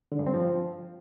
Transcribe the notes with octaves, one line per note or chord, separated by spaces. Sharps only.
D3
G2
C4
F3